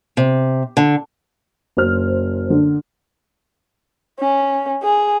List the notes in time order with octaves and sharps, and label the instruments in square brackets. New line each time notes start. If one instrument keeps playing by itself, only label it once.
[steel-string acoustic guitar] C3
D3
[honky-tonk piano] F#1 C5 F6
D3
[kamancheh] C#4
G#4